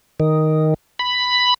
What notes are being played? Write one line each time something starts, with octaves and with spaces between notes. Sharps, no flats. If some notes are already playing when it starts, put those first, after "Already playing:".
D#3
B5